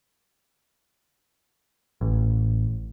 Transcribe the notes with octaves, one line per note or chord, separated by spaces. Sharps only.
A1